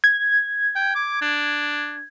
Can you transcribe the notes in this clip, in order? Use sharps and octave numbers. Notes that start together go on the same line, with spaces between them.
G#6
G5
D6
D4